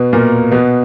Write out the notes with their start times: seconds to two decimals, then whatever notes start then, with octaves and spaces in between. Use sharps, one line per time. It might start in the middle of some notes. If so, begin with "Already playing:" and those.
Already playing: B2 B3
0.13 A#2 A#3
0.52 B2 B3